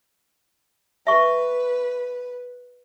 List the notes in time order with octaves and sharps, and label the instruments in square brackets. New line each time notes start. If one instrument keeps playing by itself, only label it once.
[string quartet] B4 [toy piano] E5 C#6